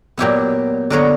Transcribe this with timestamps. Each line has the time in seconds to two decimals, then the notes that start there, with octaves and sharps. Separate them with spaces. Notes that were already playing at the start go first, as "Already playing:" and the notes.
0.17 A#2 F#3 B3 E4 G4
0.90 D3 F#3 B3 A#4 C#5